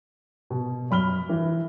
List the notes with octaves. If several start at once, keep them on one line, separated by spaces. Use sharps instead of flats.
B2
F#2 B5 F6 G7
E3